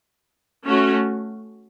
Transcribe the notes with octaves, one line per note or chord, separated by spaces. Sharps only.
A3 C#4 F#4